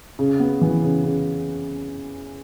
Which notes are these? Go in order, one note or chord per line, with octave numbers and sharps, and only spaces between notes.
C#3
B3
E3
C#3
C#3